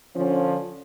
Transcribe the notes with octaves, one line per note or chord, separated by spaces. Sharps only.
D3 F3 C#4